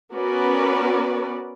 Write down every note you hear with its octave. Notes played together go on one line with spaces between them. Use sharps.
B3 C#4 F#4 A#4 B4 D5